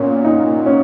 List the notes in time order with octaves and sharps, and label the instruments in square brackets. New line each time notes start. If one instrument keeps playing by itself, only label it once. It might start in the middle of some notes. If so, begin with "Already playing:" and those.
Already playing: [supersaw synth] A#2 [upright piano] B3 C#4
[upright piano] D#4
C#4